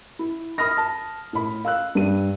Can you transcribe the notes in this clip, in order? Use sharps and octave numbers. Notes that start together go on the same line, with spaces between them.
E4
B5 D#6 F6 A#6
A5
A2 B5
F5 E6 F#6
G2 G3 D#7